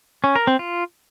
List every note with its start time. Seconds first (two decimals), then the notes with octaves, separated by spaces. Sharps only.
0.24 C#4
0.36 A#4
0.47 C4
0.59 F4